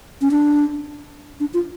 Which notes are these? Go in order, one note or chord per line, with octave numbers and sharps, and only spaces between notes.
C#4
D4
D4
F4